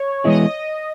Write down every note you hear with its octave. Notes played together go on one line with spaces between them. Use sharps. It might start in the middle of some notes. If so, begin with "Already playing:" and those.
Already playing: C#5
E3 G#3 B3 E4 G#4 D#5
D#5